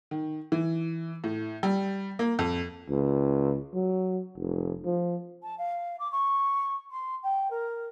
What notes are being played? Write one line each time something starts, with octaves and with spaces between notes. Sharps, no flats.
D#3
E3
A2
G3
A#3
F2
C#2
F#3
F1
F3
A5
F5
D6
C#6
C6
G5
A#4